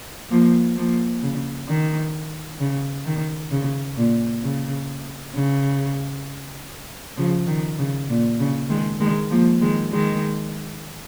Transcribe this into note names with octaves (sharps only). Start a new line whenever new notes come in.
F3 A#3
F3 A#3
C#3
D#3
C#3
D#3
C#3
A#2
C#3
C#3
C#3 F3
D#3
C#3
A#2
C#3
D#3 G#3
D#3 G#3
F3 A#3
D#3 G#3
D#3 G#3